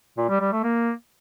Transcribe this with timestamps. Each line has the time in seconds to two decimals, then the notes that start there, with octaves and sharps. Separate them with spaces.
0.18 A#2
0.29 G3
0.41 G3
0.52 A3
0.64 A#3